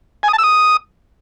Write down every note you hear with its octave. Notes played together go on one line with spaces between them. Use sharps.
G#5
D#6
A5
E6
D#6